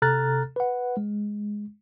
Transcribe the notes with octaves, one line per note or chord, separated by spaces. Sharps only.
C3 A4 A#5 F6 F#6 A6
B4 F#5
G#3